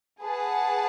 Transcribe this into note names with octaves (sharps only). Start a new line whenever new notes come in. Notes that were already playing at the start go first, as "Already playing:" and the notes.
G#4 B4 F#5 A5